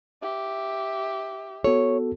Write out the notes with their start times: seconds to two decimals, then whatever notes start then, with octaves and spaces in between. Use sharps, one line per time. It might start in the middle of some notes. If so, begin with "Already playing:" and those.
0.22 G4 E5
1.64 B3 F#4 A4 C#5